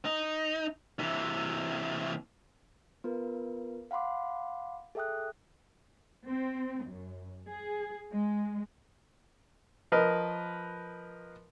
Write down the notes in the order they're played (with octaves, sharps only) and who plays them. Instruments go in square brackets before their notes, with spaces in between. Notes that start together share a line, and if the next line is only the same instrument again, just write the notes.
[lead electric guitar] D#4
C3 E3
[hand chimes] B3 F4 A#4 B4
F5 F#5 B5 C6 D6
G#4 A4 E5 G5 D#6 F#6
[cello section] C4
F#2
G#4
G#3
[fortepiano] F3 A#4 B4 D#5